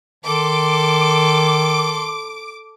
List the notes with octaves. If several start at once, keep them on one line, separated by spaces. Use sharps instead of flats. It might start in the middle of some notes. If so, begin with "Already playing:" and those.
D#3 A4 C6 D6